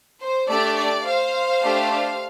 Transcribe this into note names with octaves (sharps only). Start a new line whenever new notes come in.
C5
A3 D4 G4 D5
D5
C5 F5
A3 D4 G4